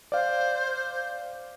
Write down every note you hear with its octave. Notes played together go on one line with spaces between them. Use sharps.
C5 D5 F5